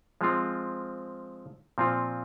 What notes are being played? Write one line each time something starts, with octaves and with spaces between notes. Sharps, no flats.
F3 G#3 C4 F4
A#2 F3 C4 F4